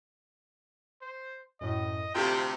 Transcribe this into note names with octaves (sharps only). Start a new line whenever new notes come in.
C5
F#2 A2 D#5
D2 C3 F4 G4 F5 G5